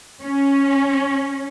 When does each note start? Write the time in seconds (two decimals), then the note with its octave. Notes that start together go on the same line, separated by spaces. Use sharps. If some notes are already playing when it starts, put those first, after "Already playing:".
0.23 C#4